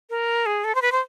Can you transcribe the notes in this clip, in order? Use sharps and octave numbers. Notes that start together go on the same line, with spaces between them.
A#4
G#4
A4
C5
B4
C5